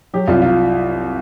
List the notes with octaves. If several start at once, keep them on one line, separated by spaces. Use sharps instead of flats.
F#3 G4
C2 F4
F4